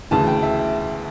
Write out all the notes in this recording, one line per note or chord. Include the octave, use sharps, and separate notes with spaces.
D2 C#3 E3 A5
G5
E5